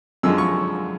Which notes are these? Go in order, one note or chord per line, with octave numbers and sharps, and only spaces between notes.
F#2 D3 F3 G#3 E6
C#6